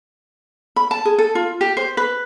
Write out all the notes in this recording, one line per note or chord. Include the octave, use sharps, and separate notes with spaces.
B5
A5
G#4
A4
F4
G4
C5
B4